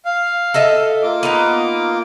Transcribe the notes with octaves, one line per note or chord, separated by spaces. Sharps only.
F5
A4 D#5 E5
A#3 F4 D6
B3 D#4